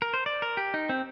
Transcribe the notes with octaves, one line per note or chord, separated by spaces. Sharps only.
A#4
C5
D5
A#4
G4
D#4
C4